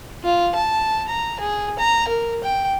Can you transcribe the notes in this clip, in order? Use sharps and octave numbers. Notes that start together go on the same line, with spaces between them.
F4
A5
A#5
G#4
A#5
A#4
G5